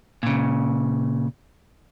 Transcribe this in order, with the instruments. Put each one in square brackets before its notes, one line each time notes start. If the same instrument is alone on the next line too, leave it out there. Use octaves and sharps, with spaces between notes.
[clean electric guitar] A#2 C#3